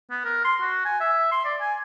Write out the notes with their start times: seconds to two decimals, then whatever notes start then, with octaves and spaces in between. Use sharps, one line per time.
0.10 B3
0.25 A#4
0.44 C6
0.61 F#4
0.85 G#5
1.01 E5
1.32 C6
1.45 D5
1.61 G#5